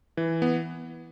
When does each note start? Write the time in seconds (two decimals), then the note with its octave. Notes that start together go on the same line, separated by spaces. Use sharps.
0.17 E3
0.42 B3